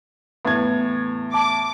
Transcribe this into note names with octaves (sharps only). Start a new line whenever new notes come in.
E2 A2 B3 G#6
A5 D6